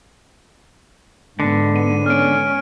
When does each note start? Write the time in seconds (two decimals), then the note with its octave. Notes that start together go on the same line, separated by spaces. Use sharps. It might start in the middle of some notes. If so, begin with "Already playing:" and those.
1.40 G#2 D3 B3
1.76 D#7
2.06 C#4 F6 D7